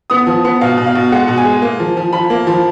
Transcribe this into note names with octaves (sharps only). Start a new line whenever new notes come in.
B3 D#6
F3
B3
B2 F5
B2
F5
B2
G#3 F#5
B2
G#5
G#3
A#3
F3
F3
F3 B5
A#3
F3